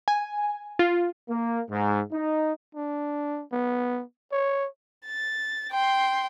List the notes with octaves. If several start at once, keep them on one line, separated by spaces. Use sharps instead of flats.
G#5
F4
A#3
G#2
D#4
D4
B3
C#5
A6
G5 C6